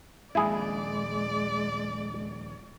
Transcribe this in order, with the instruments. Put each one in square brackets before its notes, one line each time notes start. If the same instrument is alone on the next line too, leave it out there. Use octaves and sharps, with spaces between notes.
[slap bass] D#1 A#1 F2 [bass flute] G#3 [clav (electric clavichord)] E4 G#4 [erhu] D5